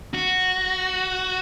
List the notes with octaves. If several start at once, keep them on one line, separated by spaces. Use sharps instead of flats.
F#4